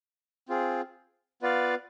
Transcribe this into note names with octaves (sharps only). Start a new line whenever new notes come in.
C4 F4 G#4
B3 F4 B4 D5 F5